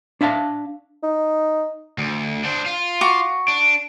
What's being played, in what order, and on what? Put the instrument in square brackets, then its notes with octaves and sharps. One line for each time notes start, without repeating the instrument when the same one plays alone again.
[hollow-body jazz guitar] D4 E5 F5 A5
[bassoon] D#4
[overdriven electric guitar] D2
D4 C5
F4
[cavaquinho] F#4 D6
[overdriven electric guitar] D4